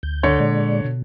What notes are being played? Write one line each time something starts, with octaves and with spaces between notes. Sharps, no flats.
D2 G6
D3 C#5
A#2 G#3 D5
B2